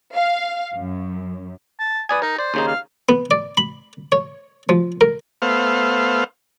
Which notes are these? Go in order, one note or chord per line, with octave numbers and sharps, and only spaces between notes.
F5
F#2
A5
B4 D5 G#5 D#6
D#4 A#4
C5 D5
D#2 C#3 D#4
F5
B3
D5
B5
C#5
F3
A#4
A3 B3 C5 F5